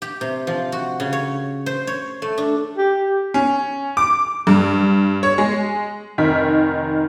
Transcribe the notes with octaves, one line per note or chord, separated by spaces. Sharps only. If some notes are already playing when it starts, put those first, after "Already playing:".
G4
C3
F3
F#4
C#3
C#5
C5
C#5
A3
D4
G4
C#4
D6
G2
C#5
G#3
F1 D#3 A#4 B6